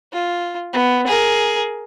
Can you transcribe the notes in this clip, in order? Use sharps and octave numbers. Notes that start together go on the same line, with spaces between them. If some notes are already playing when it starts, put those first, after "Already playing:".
F4
B3
G#4 A#4